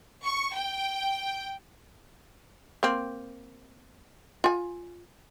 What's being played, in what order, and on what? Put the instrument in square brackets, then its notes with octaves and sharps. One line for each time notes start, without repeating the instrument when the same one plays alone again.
[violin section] C#6
G5
[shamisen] A#3 C4
F4 G#5